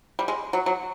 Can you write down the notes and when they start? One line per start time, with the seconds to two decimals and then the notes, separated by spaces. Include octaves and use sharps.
0.19 G3
0.28 G#3
0.53 F#3
0.66 F#3